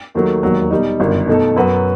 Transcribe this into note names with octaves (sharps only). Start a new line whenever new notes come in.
D#2 D#3 F#3 A3
E1 D#2 D#3 F#3
B2 G3 D#4
G1 F#2 D#3
B2 A3 D#4 A4
F#2 F#3 B3 F#4 B4